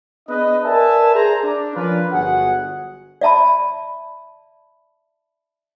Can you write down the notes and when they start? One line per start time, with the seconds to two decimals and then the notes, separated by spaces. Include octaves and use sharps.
0.29 B3 D4 G#4 B4 D#5
0.64 A#4 B4 D5 E5 G#5 A5
1.14 G#4 C5 G#5 A#5
1.44 D4
1.75 F3 C#4 D4 F4 A#4 B4
2.12 G1 F#3 F#4 G#4 F#5
3.21 D5 E5 A5 B5